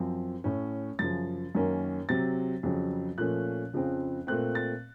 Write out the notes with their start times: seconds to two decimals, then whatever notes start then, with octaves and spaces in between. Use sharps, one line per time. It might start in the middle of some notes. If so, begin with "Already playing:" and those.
Already playing: F#2 F3 C4
0.44 A2 A3 C#4
0.99 F#2 C#3 F3 A6
1.55 F#2 D#3 A#3 C#4
2.09 C3 F#3 C4 A6
2.63 F2 C#3 F#3 C4
3.18 A#2 F3 A3 C#4 F#6
3.73 F2 C#3 F3 C4
4.27 A#2 A3 C4 F#6
4.55 A6